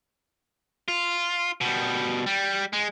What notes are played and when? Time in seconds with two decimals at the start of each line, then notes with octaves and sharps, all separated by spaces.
0.88 F4
1.61 B2 G3
2.26 G3
2.73 G#3